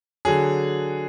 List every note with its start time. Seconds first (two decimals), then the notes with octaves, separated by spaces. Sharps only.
0.25 D3 F#3 G#4